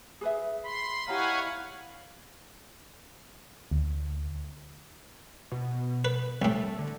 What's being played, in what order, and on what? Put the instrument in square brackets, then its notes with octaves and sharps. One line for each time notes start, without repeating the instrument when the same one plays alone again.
[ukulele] G#4 B4 E5
[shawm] B5 [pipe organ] C6
[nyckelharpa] E4 F5 [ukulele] G4 D#5 A#5 [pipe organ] C#5 F#5 G#5
[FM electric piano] D2
[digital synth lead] B2
[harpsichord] B4
[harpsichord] C2 A2 [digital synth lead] A3
[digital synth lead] D3